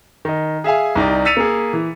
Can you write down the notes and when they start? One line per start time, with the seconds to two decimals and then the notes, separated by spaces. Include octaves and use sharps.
0.25 D#3 D#5
0.64 G#4 E5 F5 G#5
0.96 C2 D#4 G4 D5
1.25 E6 A6 B6 C#7 D#7 F7
1.37 A#3 G#4
1.73 E3